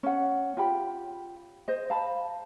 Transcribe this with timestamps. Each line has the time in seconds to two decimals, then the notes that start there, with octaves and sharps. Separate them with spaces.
0.03 C#4 F#5
0.57 F4 G4 B5
1.68 C5 D#5
1.90 F5 A5 B5